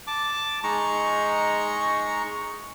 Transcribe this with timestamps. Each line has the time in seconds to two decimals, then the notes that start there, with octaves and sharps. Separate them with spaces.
0.07 A5 D6
0.63 G#3 D#4 A#5 C#6